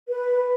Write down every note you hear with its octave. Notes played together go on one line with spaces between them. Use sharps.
B4